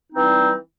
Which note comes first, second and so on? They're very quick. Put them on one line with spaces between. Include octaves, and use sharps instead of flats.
D#4 C4 E3 G3